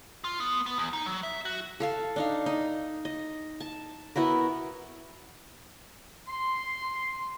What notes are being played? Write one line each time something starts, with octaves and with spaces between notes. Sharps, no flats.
F4
B3
B3
E2
D#4
F#3
E5
F#4
A4 F5 A5
D4 D#4 F5
D#4
D#5
A5
B3 E4 F#4 A#4
C6